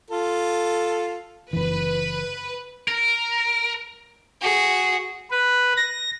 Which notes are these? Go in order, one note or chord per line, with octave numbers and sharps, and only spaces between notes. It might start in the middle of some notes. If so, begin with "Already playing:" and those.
F4 A4
F#1 E3 B4
A#4
F#4 G#4
B4
A#6